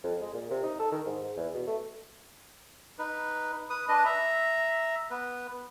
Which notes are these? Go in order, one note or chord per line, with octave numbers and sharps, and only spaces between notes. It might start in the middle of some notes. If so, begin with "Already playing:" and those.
F2
G#3
A#2
C3
D#4
A4
D#3
G#2
G#2
E2
B2
A3
D#4 B4
B4 D#6
D4 B4 D#5
E5 A#5
B3 B4